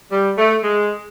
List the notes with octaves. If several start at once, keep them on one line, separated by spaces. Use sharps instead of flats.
G3
A3
G#3